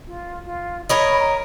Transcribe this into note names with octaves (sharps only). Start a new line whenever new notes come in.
F4
F4
A#4 C#5 D#5 B5
A#5